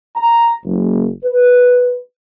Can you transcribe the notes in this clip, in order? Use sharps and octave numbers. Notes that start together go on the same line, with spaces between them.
A#5
F#1
B4